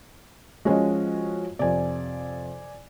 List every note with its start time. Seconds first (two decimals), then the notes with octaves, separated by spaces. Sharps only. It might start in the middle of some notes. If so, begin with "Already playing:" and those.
0.65 F3 G#3 C#4 F#4 C5 D#5
1.59 F2 C3 D5 G#5